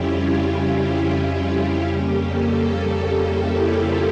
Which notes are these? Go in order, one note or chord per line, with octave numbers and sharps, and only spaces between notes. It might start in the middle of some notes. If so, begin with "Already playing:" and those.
Already playing: F2 C#3 G3 C#4 E4 F4 G4
E4
F4
E4
F2 C#3 G3 A#3 C#4 G4
A4
G4
E4
F4